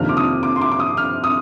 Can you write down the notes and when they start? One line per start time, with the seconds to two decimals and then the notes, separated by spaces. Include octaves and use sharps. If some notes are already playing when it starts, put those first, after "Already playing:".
Already playing: F2 C3 D#3 A#3 D4 F6
0.09 D6
0.17 D#6
0.43 D6
0.56 C6
0.62 D6
0.72 D6
0.80 D#6
0.97 F6
1.24 D#6